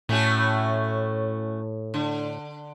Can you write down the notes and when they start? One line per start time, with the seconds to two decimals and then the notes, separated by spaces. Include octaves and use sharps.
0.09 A2 A3 C#4 F#4
1.94 D3